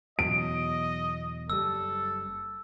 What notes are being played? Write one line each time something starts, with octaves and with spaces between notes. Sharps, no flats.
E2 B2 F#3 D#5 D7
F#1 G3 A4 E6